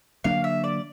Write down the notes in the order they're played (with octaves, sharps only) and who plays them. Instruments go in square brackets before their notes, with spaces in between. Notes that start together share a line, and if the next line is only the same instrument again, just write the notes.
[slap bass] D3 F#3 A#3 D4 [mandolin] F5
[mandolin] E5
D5